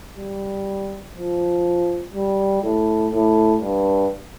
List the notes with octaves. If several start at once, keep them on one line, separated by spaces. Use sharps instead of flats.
G3
F3
G3
A2
A2
G2